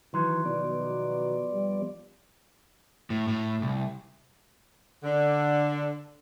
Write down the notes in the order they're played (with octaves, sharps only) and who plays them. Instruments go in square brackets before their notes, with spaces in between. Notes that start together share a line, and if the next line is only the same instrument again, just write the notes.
[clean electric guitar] D#3 F#3 [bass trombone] E3 [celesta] C6
[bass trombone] B2 [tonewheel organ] F3 B3 D5
[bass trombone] G3
[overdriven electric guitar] A2
A2
C2
[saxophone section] D3